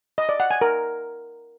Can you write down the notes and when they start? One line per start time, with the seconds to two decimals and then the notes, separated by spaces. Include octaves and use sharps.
0.18 D#5
0.29 D5
0.40 F#5
0.51 G#5
0.61 A#4